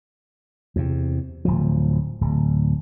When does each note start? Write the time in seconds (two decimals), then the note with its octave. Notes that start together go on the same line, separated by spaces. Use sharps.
0.76 E2 C3
1.45 D1 F3
2.21 D1